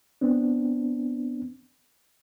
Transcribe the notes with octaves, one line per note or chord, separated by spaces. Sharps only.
B3 C4 D4